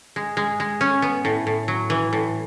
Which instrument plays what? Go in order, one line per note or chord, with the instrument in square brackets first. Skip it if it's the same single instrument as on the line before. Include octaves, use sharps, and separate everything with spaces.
[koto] G#3
G#3
G#3
C#4
B3
A2
A2
F#3
E3
A2